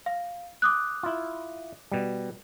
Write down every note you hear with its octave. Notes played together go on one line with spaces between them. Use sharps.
F5
D6 D#6 F#6
E4 F4
B2 G3